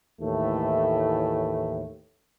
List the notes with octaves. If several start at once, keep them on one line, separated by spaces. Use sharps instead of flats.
D#2 A2 E3 A3